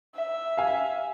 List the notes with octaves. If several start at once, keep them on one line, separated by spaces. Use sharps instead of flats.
E5
F5 G#5